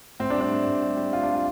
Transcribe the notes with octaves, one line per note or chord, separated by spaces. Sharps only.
A2 C4
D4
G3
D4
A2
A2
G3
G3
G3 F4
D4
G3
F4